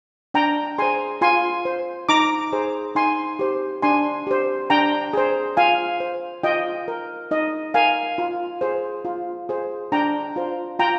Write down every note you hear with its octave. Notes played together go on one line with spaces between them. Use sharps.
D4 G5 A#5
G#4 C5 G#5 C6
F4 G#5 C6
C5
D#4 A#5 D6
G#4 C5
D#4 G#5 C6
G4 C5
D4 G#5 C6
G4 C5
D4 G5 A#5
G#4 C5
F4 F5 G#5
C5
F4 D#5 G5
A#4
D#4 D#5
A#4 F5 G#5
F4
G#4 C5
F4
G#4 C5
D4 G5 A#5
F4 C5
F4 G5 A#5